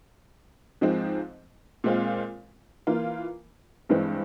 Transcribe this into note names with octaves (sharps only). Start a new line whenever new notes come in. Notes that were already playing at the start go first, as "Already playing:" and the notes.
G#2 F3 G#3 C4
A#2 G#3 C4 F4
E3 A#3 F4
G2 E3 G#3 C4